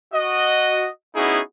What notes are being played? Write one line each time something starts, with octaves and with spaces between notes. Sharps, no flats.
F#4 D#5
B3 C#4 D#4 E4 F#4 G#4